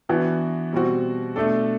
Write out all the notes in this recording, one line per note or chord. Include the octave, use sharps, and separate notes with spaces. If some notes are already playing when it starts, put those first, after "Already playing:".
E3 B3 D4 F#4
B2 G3 C4 F#4
B2 A3 D4 A4